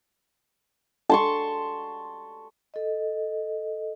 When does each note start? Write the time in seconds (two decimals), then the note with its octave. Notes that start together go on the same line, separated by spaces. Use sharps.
1.10 A5 C6 C#6
2.74 A4 D#5